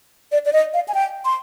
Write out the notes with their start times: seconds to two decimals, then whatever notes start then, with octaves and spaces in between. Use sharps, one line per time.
0.32 D5
0.45 D5
0.53 D#5
0.74 F5
0.88 G#5
0.94 G5
1.25 C6